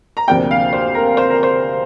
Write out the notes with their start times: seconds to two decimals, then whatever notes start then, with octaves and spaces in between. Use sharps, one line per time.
0.17 A#5
0.28 D2 C3 F3 A#3 D4 G5
0.51 F5
0.73 C5
0.95 A#4
1.17 C5
1.30 A#4
1.43 C5